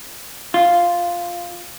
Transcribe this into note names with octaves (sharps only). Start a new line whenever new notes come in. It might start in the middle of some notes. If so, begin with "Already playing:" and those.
F4